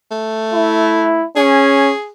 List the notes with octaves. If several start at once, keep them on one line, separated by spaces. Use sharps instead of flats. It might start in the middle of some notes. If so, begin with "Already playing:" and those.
A3
E4
C#4 G#4